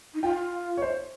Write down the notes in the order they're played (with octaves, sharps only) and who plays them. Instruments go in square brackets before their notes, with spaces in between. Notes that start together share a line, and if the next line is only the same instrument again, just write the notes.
[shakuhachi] D#4
[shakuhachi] F4 [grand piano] G5
[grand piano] C#5
C5